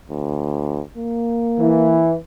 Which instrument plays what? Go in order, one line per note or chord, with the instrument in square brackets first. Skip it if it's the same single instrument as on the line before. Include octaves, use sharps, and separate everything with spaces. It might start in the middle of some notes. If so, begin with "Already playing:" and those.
[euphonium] D2
A#3
[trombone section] E3